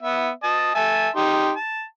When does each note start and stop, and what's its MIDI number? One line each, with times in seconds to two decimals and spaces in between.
0.03 0.29 59
0.03 0.29 76
0.43 0.73 75
0.43 0.73 81
0.75 1.09 76
0.75 1.09 80
0.75 1.09 81
1.16 1.51 63
1.16 1.51 67
1.16 1.51 84
1.56 1.84 81